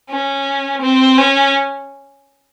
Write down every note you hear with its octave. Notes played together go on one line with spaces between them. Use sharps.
C#4
C4
C#4